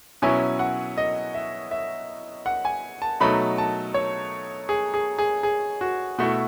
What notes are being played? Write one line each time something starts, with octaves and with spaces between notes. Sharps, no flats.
B2 F#3 C#4 E4 G#5
F#5
D#5
E5
E5
F#5
G#5
A5
B2 F#3 A3 D#4 B5
A5
C#5
G#4
G#4
G#4
G#4
F#4
B2 A3 E4 F#4